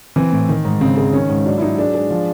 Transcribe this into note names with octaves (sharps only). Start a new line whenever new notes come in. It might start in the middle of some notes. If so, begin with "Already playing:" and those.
E3 C4
A2
D#3
G#2
C#3 C4
G#3
D#3 C#4
G#2
F#3 D4
E4
F#3 D#4
G#3 D4
G#3
F3